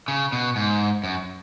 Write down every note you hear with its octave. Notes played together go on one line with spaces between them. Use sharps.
C#3
B2
G#2
F#2